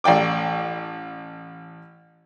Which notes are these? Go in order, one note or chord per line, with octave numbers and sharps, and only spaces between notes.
A1 D5 G5 D6